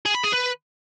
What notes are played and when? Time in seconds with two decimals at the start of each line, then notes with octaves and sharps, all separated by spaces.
0.05 G#4
0.14 B5
0.23 G#4
0.32 B4